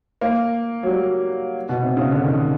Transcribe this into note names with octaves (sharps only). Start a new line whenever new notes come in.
A#3
F#3
G3
B2
C3
C#3
D3
D#3